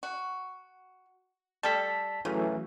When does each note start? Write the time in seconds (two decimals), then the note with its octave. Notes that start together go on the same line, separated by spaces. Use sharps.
0.03 F#4
1.63 G3 A4 A5 B6
2.25 C#3 E3 F#3 A3